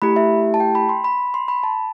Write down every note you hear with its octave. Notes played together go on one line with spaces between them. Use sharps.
A3 E4 G4 B5
E5
A5
G5
B5
C6
B5
C6
B5
A5